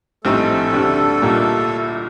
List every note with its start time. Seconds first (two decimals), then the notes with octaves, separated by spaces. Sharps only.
0.24 A#1 A2 G3 A3 C4 D#4 A4
0.73 D2 D3 G3 D4
1.22 C2 A#2 G3 A#3 D#4